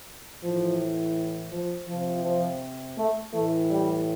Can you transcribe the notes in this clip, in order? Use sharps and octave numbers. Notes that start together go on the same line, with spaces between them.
A2 E3 F3
F3
C3 F3
F3
A3
A2 E3 A3
G3